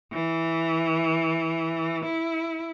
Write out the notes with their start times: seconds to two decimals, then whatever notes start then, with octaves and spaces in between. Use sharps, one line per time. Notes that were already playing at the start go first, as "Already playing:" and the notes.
0.13 E3
2.05 E4